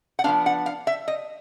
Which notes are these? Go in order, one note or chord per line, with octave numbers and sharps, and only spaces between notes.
F#5
F3 G#3 B3 D4 F5
F#5
F5
E5
D#5